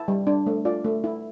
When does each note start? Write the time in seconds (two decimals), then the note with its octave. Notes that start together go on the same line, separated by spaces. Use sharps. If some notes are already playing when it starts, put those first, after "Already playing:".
Already playing: E4 A5
0.08 G3
0.27 D4
0.46 A3
0.65 F4 D5
0.84 A3
1.04 E4